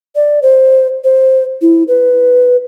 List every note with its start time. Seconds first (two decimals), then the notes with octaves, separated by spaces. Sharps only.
0.16 D5
0.42 C5
1.04 C5
1.62 E4
1.88 B4